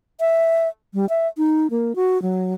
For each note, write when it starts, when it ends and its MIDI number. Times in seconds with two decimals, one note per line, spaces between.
0.20 0.68 76
0.94 1.08 55
1.09 1.27 76
1.38 1.67 63
1.70 1.95 58
1.96 2.21 66
2.22 2.54 54